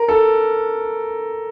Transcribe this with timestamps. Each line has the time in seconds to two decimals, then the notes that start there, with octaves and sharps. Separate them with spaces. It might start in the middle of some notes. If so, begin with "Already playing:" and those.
Already playing: A#4
0.08 A4